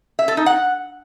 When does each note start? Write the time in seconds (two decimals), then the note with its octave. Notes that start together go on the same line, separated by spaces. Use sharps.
0.19 E5
0.28 A4
0.37 D#4
0.46 F#5